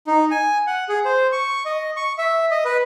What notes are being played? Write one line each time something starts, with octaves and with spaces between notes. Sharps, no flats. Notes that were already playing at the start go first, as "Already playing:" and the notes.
D#4
G#5
F#5
G#4
C5
C#6
D#5
C#6
E5
D#5
B4